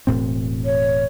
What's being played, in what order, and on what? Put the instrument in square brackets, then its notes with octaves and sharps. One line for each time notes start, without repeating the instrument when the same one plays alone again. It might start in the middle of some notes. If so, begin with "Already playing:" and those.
[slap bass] E1 A2 C4
[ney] C#5